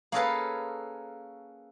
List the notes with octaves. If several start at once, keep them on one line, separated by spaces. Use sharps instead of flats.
A#3 C#4 G#4 A4 B4 F5